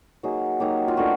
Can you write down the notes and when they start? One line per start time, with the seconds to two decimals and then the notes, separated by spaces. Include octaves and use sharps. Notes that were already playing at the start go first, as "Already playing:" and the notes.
0.23 F#3 A#3 D#4 G#4
0.60 F#3 A#3 D#4 G4
0.88 F4
0.97 E3 A3 D4 F#4